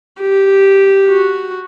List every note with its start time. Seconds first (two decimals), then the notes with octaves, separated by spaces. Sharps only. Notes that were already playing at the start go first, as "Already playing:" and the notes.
0.21 G4
1.08 F#4